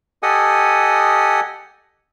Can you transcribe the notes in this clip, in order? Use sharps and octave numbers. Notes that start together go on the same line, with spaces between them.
G4 A4 D#5 F#5 G#5 D#6